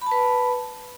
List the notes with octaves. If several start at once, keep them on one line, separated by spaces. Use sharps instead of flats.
B4 A5 B5